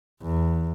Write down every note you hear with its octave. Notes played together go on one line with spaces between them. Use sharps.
E2